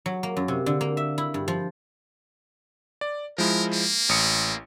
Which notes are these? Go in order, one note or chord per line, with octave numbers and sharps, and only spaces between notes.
F#3
A#3
F#2
C3
D3
A#3
E5
E4
G2
F3
D5
F3 G#3 E4 A#4
A#3
A1 D#6 C#7